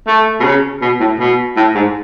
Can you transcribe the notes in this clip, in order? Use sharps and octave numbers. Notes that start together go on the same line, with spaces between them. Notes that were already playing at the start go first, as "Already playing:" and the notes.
A3
B2
C#3
B2
A2
B2
A2
G#2